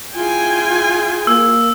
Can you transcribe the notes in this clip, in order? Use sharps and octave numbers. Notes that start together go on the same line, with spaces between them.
E4 F4 G#4 G5 G#5
A#3 E6